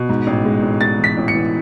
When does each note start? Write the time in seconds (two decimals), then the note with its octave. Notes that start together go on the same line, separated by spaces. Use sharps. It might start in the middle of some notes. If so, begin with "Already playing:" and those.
Already playing: B2
0.09 G#2
0.27 A1
0.45 G#3
0.63 A1
0.80 G#3 A6
0.99 E3 B6
1.17 A1
1.28 C#7
1.35 E3